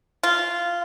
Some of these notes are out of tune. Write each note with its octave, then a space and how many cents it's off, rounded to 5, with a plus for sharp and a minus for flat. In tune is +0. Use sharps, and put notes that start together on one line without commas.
F4 -10